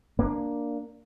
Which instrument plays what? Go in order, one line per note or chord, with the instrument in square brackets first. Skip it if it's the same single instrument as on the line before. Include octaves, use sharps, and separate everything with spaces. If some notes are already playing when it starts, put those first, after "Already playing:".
[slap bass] A#3 D4